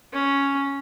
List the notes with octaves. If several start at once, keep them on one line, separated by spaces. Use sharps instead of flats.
C#4